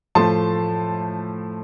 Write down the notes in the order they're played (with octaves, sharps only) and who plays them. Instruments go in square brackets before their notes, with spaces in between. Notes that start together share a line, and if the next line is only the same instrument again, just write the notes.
[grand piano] A2 F3 A3 A5 C6